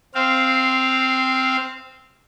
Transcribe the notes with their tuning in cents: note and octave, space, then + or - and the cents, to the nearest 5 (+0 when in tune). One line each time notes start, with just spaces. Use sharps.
C4 +0 F5 -10